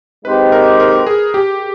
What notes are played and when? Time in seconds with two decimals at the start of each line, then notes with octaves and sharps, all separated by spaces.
0.24 G#3 C4 D#4 G4 B4 C5
0.52 A#4
0.80 A#4
1.07 G#4
1.34 G4